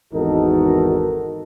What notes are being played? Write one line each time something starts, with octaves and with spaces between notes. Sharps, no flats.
G#1 E2 D#4 F#4 A4 A#4